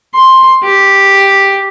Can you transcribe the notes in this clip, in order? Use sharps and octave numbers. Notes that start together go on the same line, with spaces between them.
C6
G4